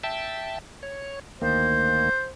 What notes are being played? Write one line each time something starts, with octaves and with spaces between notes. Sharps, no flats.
E5 G5 A5
C#5
D2 D#3 A#3 C5